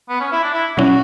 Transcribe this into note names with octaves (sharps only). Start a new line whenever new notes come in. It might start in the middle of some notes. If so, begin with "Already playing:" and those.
B3
C#4
E4
D4
E4
B2 F#3 C#4 E4 F#4